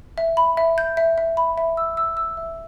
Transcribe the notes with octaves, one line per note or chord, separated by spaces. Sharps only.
E5
B5
E5
G6
E5
E5
B5
E5
E6
E6
E6
E5